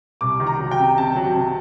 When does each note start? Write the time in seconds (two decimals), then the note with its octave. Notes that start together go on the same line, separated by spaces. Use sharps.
0.21 C2 D6
0.40 D#3
0.47 A#5
0.59 F#3
0.71 G5
0.79 C3
0.97 C3 A5
1.16 F#3
1.35 C3